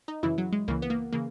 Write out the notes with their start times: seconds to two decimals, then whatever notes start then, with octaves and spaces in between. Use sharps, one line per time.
0.08 D#4
0.23 F#2 C#3 E3 E4
0.38 F#3
0.52 G#3
0.68 C#2 C#3 E3 A#3
0.82 B3
0.90 A#3
1.12 C#3 E3 A#3